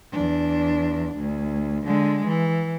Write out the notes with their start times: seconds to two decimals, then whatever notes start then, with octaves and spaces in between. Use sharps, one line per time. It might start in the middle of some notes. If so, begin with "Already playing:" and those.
0.12 E2 D4
1.17 D2
1.86 D3 G#3
2.26 E3